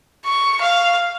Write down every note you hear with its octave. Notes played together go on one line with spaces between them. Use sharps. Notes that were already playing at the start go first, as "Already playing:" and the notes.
C#6
F5